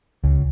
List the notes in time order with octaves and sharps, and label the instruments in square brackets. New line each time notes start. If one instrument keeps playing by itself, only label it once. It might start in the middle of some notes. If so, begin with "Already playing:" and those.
[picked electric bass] C#2